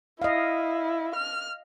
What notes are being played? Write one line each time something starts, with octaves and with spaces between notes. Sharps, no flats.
E4 D#5 F5
F6